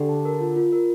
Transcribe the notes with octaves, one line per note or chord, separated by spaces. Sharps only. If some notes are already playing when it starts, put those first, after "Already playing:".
Already playing: D3 G4
A5
A#4
F4
F4
A#4